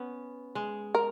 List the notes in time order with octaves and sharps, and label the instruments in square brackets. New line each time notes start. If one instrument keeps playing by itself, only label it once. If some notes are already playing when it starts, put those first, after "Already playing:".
Already playing: [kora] B3 C#4
G#3
[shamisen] A#4